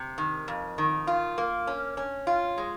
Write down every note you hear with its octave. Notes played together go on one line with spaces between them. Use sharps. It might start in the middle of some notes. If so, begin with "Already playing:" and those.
Already playing: C3
D#3
F2
D#3
F4
A#3
C#4
C#4
F4
G#3